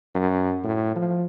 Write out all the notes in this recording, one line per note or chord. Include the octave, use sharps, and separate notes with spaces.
F#2
A2
F3